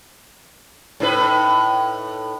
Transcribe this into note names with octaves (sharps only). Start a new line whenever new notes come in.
A2 D#4 B4